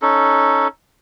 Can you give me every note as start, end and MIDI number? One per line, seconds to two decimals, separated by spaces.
0.02 0.68 61
0.02 0.68 63
0.02 0.68 69